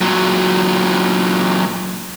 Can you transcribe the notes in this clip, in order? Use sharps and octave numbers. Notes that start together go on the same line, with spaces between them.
A#2 F#3